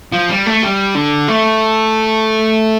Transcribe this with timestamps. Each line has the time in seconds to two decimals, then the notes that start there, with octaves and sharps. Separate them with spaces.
0.13 F3
0.29 G3
0.46 A3
0.62 G3
0.95 D3
1.28 A3